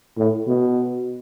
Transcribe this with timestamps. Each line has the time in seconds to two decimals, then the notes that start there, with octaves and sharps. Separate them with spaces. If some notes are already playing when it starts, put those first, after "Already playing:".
0.18 A2
0.47 B2